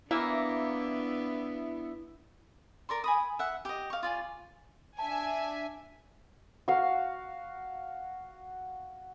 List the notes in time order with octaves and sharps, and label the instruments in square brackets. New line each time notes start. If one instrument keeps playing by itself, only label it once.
[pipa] E3 A#3 [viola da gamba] B3 D4 [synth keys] E4 E5
[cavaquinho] A#4 D5 C6
G#5 B5 D#6
E5 F#5
G4 D#5
F5 C#6
F4 D5 G#5
[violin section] D4 E5 G#5 [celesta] A5
[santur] F#4 F5